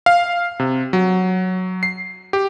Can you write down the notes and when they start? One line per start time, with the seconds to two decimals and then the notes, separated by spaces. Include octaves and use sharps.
0.06 F5
0.60 C3
0.93 F#3
1.83 C7
2.33 G4